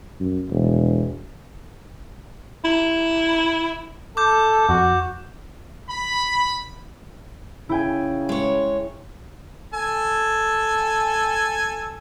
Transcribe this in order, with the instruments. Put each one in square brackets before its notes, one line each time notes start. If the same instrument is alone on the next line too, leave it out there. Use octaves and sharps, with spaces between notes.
[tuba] F#2
E1
[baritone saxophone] E4
[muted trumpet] A4 [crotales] D6 G6
[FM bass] F2 [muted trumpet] F#4
[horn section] B5
[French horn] C#3 [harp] E4 G5 G#5
[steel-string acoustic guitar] G#3 C#5
[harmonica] A4 G#5